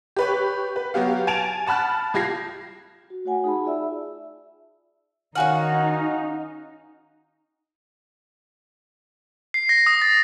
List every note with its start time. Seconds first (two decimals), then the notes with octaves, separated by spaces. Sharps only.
0.16 G4 B4 C#5
0.76 B4
0.94 F#3 B3 G4 F5
1.27 G#5 A5 D7 F7
1.67 F#5 A5 B5 F6 F#6
2.14 C2 F4 G4 G#6 A#6 C7
3.10 F#4
3.25 A3 F#4 C#5 F#5 G#5
3.44 D#4 G#4 F#5 A5 B5
3.64 F4 G#4 D5 E5 E6
5.35 D#3 C#4 D#4 F#4 F5 F#5 G#5 F6
9.54 C7
9.69 A#6
9.86 D#6
10.02 A6